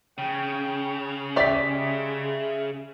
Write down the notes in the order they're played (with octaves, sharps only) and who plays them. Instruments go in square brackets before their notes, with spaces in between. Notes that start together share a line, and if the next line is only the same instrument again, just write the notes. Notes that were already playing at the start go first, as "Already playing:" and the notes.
[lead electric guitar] C#3 [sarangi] G5
[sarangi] G#3 [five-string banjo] G4 D5 [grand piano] E5 B6